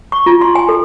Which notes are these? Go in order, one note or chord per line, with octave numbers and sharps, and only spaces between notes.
C#6
F4
C6
G#5
A4